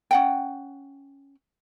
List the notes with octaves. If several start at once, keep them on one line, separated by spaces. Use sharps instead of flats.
C#4 F#5 G5